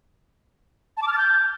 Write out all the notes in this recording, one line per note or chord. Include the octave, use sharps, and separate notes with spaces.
A5
D6
F6
A6
G6